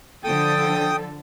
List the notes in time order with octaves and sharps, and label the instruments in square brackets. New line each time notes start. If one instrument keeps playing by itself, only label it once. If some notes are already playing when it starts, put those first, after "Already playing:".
[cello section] D3 F3 A4 [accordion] G5 D#6